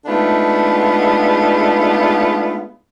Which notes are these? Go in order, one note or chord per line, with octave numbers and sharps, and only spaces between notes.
G#3 A3 B3 D4 D#4 F4